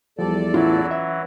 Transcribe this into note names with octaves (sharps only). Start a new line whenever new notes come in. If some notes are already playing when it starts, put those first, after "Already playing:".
E2 F3 G3 A4 D5
A2 E3 F#3 C#4 E4 F4
E5